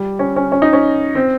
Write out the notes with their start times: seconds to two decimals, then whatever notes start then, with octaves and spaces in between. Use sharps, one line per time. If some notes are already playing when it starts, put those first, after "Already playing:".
Already playing: G3
0.19 C#4
0.36 C#4
0.52 C#4
0.62 D#4
0.73 C#4
1.15 C4